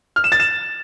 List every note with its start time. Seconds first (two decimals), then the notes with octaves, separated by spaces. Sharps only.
0.16 F6
0.24 E7
0.32 A6
0.40 E7